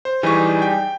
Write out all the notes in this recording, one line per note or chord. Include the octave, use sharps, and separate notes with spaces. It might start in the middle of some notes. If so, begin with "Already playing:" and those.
C5
E3 G3 D#4 G#4 C#6
G5